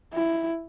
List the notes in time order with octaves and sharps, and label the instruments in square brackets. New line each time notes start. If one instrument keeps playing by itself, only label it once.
[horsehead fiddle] E4